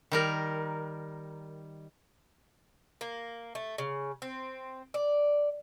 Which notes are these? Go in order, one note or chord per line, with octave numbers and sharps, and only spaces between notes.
D#3 G3 A#4
A#3
A3
C#3
C4
D5